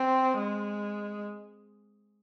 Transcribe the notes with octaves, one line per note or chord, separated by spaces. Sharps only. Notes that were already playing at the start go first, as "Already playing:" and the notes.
Already playing: C4
G#3